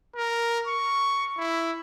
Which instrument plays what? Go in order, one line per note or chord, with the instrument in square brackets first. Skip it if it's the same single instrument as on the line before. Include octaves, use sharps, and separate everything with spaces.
[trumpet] A#4
C#6
E4